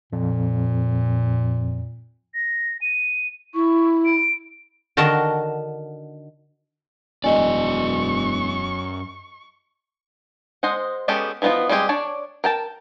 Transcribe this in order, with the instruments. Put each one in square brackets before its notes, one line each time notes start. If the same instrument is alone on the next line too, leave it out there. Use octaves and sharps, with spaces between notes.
[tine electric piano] F2 [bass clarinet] A#2
[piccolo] A#6
D#7
[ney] E4 [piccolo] C#6
[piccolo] D7
[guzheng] D3 D#3 F#4 A#4 D#5 A5
[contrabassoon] E1 [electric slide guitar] F#2 F#4 D5 [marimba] D#5 G#5 [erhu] C#6
[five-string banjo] G#3 C5 D#5 F#5
G#3 B3 C#4 G4 A4
E3 F3 B3 D#4 F4
G3 G#3 C4 G4 G#4
D4 C#5 D5
A#4 G5 A5